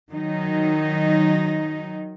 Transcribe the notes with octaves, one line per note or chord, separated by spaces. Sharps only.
D#3 F#3 D#4